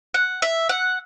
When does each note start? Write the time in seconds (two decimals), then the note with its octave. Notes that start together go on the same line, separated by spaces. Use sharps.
0.14 F#5
0.42 E5
0.69 F#5